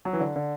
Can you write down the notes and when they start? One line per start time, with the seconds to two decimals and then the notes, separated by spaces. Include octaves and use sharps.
0.05 F#3
0.13 E3
0.20 D3
0.36 D3